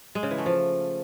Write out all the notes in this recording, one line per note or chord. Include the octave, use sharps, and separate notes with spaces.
G#3
C#3
E3
A3
F3